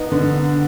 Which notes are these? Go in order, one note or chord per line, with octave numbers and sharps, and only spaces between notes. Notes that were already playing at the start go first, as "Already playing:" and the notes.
Already playing: B3 D#4
D3